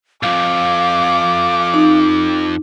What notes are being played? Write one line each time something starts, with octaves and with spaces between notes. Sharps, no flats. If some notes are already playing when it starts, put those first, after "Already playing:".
B1 F2 F5 D6
D#4